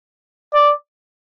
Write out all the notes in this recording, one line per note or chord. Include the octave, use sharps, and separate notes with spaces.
D5